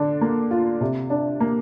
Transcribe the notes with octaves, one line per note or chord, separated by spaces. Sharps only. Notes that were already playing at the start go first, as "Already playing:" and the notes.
Already playing: D3 D4
A#3
F4
C3
D4
A#3